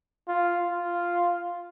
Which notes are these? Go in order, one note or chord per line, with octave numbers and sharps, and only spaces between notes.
F4
F4